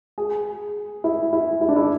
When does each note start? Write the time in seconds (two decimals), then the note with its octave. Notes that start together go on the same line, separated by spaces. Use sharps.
0.18 G#4
1.04 E4
1.33 E4
1.61 E4
1.69 D4
1.76 E4